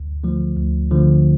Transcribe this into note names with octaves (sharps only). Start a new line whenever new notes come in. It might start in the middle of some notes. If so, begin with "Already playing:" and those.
Already playing: D2
D3 F3 A3
D2
D3 F3 A3